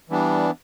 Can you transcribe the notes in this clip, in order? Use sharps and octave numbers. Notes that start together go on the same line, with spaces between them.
E3 G3 B3 D4